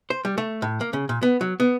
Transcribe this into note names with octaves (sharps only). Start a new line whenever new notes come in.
C5
G3
A3
A2
A#3
C#3
A#2
B3
F#3
B3